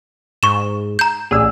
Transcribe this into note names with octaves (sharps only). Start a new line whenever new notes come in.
G#2 C#6 E7
A#5 G6
A1 G#4 D5 E6